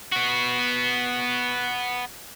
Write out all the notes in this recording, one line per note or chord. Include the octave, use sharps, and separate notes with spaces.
B3 F#4